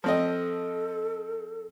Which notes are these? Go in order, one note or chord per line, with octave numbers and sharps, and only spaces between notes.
F3 C4 A4 D#5